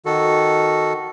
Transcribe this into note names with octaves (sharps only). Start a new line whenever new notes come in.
D#3 F#4 A4